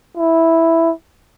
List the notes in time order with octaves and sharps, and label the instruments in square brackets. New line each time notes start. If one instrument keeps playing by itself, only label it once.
[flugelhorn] E4